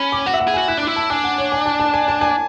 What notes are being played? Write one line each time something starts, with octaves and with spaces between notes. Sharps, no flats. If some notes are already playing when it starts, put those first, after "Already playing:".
Already playing: C#4 B5
D6
F#4 F#5
E5
F#5
G#4
F#4 G#5
E4 F#6
D4
E4 D6
A5
D4 G#5
F#5
C#5
G#5
A5
A5
G#5
A5
G#5